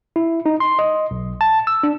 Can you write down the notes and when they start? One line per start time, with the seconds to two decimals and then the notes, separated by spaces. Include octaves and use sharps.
0.16 E4
0.46 D#4
0.60 C6
0.79 D#5
1.11 B1
1.41 A5
1.67 E6
1.83 D4